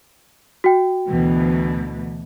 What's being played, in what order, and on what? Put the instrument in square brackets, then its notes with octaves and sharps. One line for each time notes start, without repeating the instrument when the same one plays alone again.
[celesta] F#4 G5
[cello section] D2 B2 E3